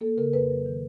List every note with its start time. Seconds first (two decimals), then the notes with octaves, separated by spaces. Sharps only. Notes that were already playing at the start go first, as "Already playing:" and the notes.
0.01 A#3 A4
0.17 C#3 A#4
0.33 F2 B4
0.50 F#3
0.66 D#3